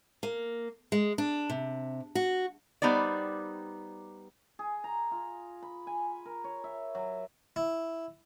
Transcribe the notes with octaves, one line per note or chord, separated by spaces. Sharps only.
A#3
G#3
D4
C3
F#4
G3 B3 D#4 C5 D5
G#4
A#5
F4
B5
G#5
A#4
C#5
E5
F#3
E4